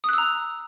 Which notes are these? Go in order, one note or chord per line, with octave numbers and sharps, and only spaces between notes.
A#5 D#6 E6 F#6